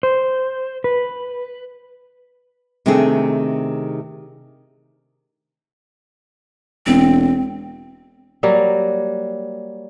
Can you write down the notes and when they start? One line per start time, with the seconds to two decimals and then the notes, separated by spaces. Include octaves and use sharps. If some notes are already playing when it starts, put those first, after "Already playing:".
0.03 C5
0.84 B4
2.86 C3 D#3 A3 C4 D4 G#4
6.86 E1 C4
8.43 F#3 G3 A#3